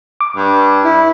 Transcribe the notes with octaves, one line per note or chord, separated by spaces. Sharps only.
D6
G2
E4